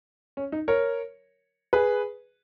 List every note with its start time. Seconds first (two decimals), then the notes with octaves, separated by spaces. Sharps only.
0.37 C#4
0.52 D#4
0.68 A#4 C#5
1.73 G#4 B4